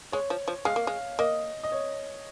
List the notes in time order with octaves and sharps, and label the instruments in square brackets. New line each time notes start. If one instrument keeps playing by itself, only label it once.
[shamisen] G#3 [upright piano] C#5
[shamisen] F3
F3
[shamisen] G#3 [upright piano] F5
[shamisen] A#3
G#3
[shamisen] A#3 [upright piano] D#5
[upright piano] D#5
C#5